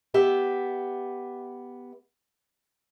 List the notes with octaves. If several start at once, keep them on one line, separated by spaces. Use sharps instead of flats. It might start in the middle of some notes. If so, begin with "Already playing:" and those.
B3 G4 E5